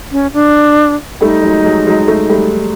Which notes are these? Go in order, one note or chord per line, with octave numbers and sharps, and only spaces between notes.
C#4
D4
G3 A3 D#4
F#3 G#3
F#3 G#3
F#3 G#3
A3
G3 A3